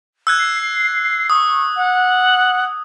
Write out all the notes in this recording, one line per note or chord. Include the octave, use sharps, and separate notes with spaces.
E6 F#6 G#6
C7
C#6 D#6
F#5